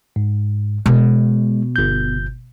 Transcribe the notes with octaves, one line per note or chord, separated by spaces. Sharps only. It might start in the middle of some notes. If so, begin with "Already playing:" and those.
G#2
B2 G#3
G1 G6